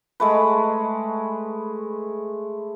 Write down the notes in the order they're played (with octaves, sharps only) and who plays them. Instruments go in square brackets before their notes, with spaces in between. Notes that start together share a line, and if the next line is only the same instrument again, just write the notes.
[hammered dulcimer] G#3 A3 B4